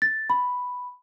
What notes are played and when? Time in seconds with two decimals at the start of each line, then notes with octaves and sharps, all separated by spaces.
0.02 A6
0.30 B5